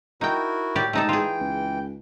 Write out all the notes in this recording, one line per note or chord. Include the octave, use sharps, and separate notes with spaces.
D#4 E4 F#4 A#4 G5
A2 G4 D5
G#2 C3 A3 D#4 A4
E3 F4 G#4 G5
C#2